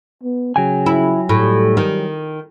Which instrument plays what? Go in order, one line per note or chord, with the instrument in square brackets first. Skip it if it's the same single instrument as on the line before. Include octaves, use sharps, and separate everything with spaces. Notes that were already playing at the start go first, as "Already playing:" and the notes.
[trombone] B3
[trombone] C#3 [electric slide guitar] F#3 G5 G#5
[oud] E4
[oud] A2 [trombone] G3
[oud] D#3